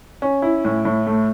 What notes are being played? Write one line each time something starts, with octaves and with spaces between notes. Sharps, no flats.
C#4
E4
A2
A2
A3